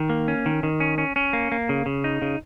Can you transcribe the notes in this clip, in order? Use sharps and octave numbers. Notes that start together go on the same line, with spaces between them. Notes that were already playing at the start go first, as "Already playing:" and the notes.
Already playing: D#3
A#3
C#4
D#3
D#3
C#4
C#4
C#4
A#3
A#3
C#3
C#3
D#4
C#3